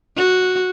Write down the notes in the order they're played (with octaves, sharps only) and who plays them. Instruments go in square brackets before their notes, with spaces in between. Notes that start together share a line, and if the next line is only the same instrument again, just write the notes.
[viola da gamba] F#4